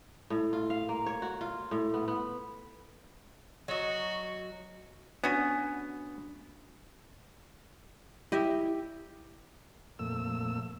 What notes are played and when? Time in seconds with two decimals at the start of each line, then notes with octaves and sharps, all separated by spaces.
0.30 A2
0.53 F4
0.70 F5
0.89 A#3
1.06 C#5
1.22 F#4
1.41 F4
1.71 A2
1.94 B3
2.08 B3
3.68 F#3 F#4 D#5
5.24 B3 C#4 D4 F#4 G#5
8.32 E4 G4 D#5
9.99 F2 A#2 A3 E6